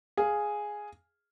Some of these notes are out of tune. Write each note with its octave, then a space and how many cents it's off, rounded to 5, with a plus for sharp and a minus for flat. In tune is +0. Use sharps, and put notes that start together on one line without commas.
G#4 +0 F5 +0